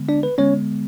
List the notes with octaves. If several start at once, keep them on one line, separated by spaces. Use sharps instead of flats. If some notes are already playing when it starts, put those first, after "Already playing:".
Already playing: D3 G#3 B3
D4 D5
B4
D3 G#3 B3 C#4 C#5